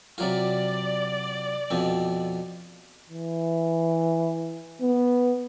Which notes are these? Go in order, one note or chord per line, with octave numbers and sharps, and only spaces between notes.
C3 F#3 F4 D5
F2 B2 C4
E3
B3